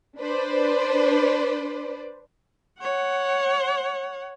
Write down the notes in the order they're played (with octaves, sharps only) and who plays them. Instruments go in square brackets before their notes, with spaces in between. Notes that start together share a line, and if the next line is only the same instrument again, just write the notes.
[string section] D4 B4 C5 D5
[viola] C#5 F#5